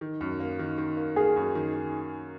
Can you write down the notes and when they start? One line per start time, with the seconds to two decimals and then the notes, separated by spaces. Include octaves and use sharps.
0.01 D#3
0.21 F#2
0.40 A#3
0.59 D#3
0.78 D#3
0.97 A#3
1.16 A#3 G#4
1.36 F#2
1.55 D#3
1.75 D#3